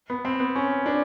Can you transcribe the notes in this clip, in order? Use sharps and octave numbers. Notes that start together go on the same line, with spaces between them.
B3
C4
B3
C#4
D4